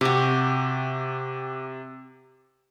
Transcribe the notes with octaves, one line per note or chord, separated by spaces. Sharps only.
C3 F#4 G4